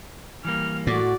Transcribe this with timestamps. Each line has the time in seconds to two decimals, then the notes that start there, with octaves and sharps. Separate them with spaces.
0.45 E3 G3 A#3 F6
0.87 A2 F#4 D5